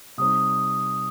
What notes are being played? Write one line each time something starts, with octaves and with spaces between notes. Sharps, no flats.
C3 G3 D#4 C5 D#6